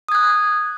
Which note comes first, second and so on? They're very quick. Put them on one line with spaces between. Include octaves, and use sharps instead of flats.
D#6 G#6 F#6